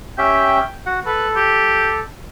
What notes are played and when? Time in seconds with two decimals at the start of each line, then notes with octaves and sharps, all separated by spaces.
0.18 C#4 G4 E5 G5
0.86 F#4 F#5
1.06 A4 B4
1.36 G4